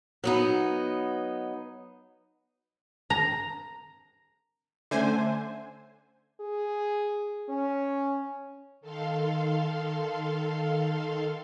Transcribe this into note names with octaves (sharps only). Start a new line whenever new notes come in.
F#3 B3 D#4
A#5
D3 A3 C#4 C5 E5 G#5
G#4
C#4
D#3 A4 F5 C6